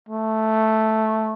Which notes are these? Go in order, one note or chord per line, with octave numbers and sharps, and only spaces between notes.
A3